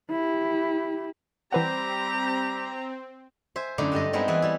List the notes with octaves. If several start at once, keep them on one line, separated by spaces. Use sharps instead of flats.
E4 G4
E3 G3 C4 G4 B4 F#5 A#5
C5 E5 G#5
F#2 D3 A3 D#4 E4
G2 G3 A4 D#5
G3 G#3 B3 C4 D#4 E4
E3 G#4 E5 F#5 A5
G3 E4